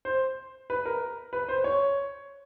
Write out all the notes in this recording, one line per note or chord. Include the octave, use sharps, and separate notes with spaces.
C5
B4
A#4
B4
C5
C#5